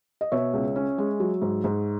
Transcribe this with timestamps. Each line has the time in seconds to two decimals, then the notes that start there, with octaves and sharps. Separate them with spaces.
0.21 D#5
0.32 B2 C#5 E5
0.54 C#2
0.76 C#4
0.98 G#3
1.20 F#3
1.42 G#2
1.64 G#2